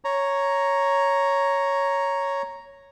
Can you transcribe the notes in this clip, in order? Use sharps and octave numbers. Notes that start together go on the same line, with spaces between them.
C#5 A#5